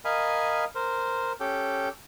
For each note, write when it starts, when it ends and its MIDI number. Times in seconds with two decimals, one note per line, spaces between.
0.05 0.65 70
0.05 0.65 75
0.05 0.65 77
0.05 0.65 80
0.05 0.65 83
0.75 1.32 70
0.75 1.32 72
1.40 1.89 61
1.40 1.89 67
1.40 1.89 69
1.40 1.89 79